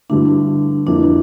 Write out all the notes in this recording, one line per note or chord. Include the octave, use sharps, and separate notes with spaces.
G2 D3 A3 D4 E4
F2 E3 A#3 D4